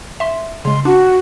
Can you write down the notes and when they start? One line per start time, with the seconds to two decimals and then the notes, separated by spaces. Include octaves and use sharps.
0.20 E5 C6
0.65 C#3 G#3 C6
0.85 D4 F#4